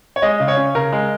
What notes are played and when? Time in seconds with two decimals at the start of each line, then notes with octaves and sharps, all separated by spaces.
0.16 C#5
0.22 G#3 D#5
0.40 C#3
0.48 C#5
0.57 C#4
0.75 C#3 A#4
0.92 G#3